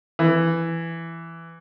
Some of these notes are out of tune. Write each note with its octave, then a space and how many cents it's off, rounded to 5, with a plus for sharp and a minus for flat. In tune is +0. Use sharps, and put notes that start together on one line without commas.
E3 +10